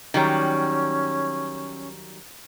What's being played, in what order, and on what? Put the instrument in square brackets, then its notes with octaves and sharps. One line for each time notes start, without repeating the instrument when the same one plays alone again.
[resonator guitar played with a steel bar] D#3 F#3 G3 [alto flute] C#4